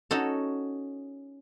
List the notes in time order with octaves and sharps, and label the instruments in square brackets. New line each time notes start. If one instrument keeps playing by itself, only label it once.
[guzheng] C#4 D#4 F#4 A4